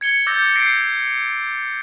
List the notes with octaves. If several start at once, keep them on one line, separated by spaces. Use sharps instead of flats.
G#6 C#7 G7
D6 E6 G6 A6 A#6
G6 A#6 C7 D7